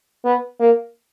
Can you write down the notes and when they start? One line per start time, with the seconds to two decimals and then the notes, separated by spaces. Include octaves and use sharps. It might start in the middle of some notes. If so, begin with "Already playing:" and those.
0.25 B3
0.60 A#3